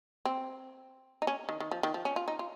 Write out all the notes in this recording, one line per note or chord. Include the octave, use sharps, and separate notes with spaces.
C4
D#4
C#4
D#3
D#3
F3
D#3
F3
C#4
F4
D#4
F4